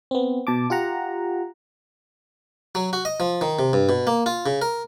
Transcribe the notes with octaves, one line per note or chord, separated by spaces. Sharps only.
B3 C4
B2 A5 D6
F4 G4 F#5 A#5
F#3
F#4
D#5
F3
D#3
C3
G2
B2
A#3
F4
C#3
A#4